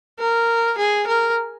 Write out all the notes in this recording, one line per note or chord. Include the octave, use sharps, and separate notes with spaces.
A#4
G#4
A#4